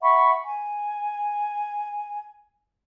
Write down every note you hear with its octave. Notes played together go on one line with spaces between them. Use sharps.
E5 F#5 B5 C#6
G#5